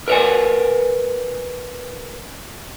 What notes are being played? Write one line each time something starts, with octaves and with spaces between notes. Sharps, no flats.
A#4 B4 C#5 F#5 G#5